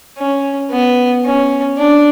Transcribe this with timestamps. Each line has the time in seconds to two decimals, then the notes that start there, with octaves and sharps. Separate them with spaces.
0.18 C#4
0.71 B3
1.25 C#4
1.78 D4